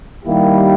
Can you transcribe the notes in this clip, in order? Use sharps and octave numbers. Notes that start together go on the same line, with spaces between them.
D#3 G3 A#3 E4 G4